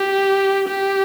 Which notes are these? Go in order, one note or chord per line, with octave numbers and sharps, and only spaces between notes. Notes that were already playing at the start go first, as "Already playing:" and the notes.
Already playing: G4
G4